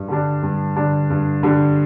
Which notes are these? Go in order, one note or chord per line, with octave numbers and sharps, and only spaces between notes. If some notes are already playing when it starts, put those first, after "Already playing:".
Already playing: G2
D3 G3 D4
G2
D3 G3 D4
G2
D3 G3 D4